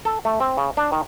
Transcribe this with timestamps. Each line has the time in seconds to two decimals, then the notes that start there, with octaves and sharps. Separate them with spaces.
0.05 A4
0.25 A3
0.40 C4
0.57 C#3
0.77 D4
0.92 D#3